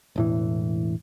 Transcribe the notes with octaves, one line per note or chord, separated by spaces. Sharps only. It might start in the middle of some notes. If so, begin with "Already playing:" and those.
E1 A2 E3